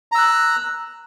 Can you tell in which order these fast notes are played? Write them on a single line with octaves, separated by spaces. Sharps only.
A#5 E6 F#6